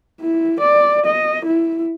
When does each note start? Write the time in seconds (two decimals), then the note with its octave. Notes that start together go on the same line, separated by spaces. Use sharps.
0.21 E4
0.60 D5
1.06 D#5
1.45 E4